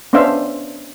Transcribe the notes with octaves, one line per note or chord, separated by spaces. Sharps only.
B3 C#4 D4 C5 E5 F5